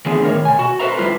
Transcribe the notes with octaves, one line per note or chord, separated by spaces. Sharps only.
D3 E3 F3 B3 G#4
A2 D#3 A#4 C#5
B2 G#5
F#4
A4 B4 C5 E5 A#5
F2 F3 G3 E4 F4 B4